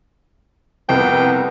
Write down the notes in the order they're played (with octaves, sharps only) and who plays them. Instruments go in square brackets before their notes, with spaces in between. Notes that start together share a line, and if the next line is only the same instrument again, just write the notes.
[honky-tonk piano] C2 F2 [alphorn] B3 [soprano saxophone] G5